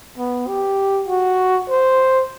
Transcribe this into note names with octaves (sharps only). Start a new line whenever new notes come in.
B3
G4
F#4
C5